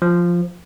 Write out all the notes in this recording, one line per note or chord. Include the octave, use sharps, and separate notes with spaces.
F3